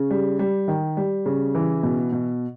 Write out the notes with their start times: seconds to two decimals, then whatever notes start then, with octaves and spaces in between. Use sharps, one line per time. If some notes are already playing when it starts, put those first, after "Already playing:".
Already playing: C#3
0.11 G3
0.39 G3
0.68 D#3
0.97 G3
1.26 C#3
1.55 E3
1.83 B2
2.12 B2